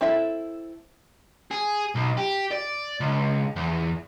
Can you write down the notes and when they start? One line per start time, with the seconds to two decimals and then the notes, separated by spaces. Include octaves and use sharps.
0.01 C4 E4 A4 E5
1.51 G#4
1.95 B1
2.17 G4
2.51 D5
3.00 C#2
3.56 E2